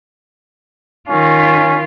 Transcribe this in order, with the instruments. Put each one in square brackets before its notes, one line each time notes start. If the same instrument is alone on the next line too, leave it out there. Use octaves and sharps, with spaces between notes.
[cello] D#3 F4 [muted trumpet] C#4